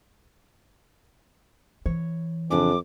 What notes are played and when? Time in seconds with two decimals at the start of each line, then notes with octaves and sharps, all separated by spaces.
1.86 E3 C#5
2.51 F2 C#3 D4 G#5 D6